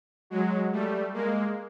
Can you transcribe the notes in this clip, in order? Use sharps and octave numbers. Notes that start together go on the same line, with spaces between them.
F#3 G#3
G3 A3
G#3 A#3